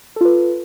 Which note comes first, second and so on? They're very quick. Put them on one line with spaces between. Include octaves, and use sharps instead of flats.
A4 F4 B4